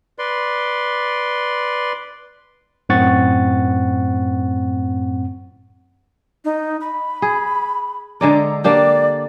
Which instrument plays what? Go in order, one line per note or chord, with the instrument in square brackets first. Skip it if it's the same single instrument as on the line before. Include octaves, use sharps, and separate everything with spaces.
[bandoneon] B4 D5 C6
[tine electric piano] F#2 A2 C4 F#5 C#6 A6
[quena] D#4
B5
[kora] G#4
[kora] D3 G#3 D5 [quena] A#5
[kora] A#3 D4 G4 [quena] D5